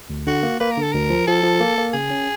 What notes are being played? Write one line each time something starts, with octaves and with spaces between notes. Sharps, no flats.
D2
D3 F#4
A#3
A#3 B4
A#4
D3
A4
D2 A#4
F3
F3 A4
F3
A#3
A#3
C#3 G#4
C#4